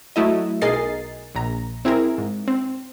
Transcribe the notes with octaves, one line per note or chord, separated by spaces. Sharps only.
F#3 A3 E4 D#5
B1 G#4 A#4 D#5 A6 C7
A#1 A#5
C4 E4 G#4 A#4
G#2
C4